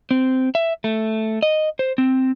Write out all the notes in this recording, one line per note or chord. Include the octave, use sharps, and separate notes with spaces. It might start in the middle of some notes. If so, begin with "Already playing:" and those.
C4
E5
A3
D#5
C5
C4